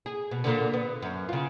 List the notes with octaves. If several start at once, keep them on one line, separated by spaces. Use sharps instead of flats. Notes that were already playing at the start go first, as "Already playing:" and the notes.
G#4
B2
A#2 D3
B3
F#2
C#3 F4